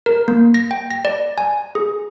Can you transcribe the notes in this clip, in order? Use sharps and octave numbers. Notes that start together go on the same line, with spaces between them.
A#4
A#3
A#6
G5
A#6
D5
G#5
G#4